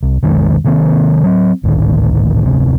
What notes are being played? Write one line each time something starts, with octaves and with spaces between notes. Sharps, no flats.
C2
B1 F2 D#3 G#3
C3 D#3 A#3 C4
F#3 C4
G#1 D2 A2 D#3
F1 D2 C3